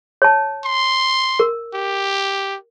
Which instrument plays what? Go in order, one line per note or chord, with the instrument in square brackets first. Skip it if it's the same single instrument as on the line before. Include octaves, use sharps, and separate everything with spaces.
[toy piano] C#5 A5
[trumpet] C6
[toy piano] A#4
[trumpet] G4